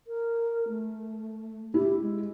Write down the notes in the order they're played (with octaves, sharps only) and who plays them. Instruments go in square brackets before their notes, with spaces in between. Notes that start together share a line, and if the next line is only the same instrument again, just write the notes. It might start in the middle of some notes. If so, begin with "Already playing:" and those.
[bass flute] A#4
A3
[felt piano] E4 [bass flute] G4
[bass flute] G#3